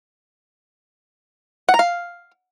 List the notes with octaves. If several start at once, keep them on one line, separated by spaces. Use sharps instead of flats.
F#5
A#5
F5